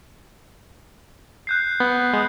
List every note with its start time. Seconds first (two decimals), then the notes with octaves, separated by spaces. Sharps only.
1.47 F#6 G6 C7
1.80 B3
2.13 G#3